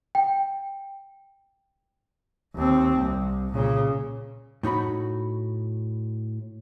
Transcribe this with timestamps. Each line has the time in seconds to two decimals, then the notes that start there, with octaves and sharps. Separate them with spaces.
0.15 G5
2.55 D#2 C4
2.98 C2
3.53 A#2 C#3
4.63 A2 D#4 F#4 B5